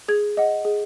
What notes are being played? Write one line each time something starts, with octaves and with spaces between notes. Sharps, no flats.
G#4 G#6
D#5 F#5
G#4